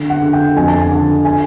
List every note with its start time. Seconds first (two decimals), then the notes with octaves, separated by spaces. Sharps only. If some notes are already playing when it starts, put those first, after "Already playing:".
Already playing: D3
0.10 F#5
0.22 D3
0.33 G5
0.56 F2 G#5
0.68 A5
0.81 G#5
0.91 D3
1.25 G#5